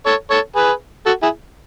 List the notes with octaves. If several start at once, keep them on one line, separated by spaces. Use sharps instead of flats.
A4 C#5
A4 C#5
G#4 B4
F#4 A4
E4 G#4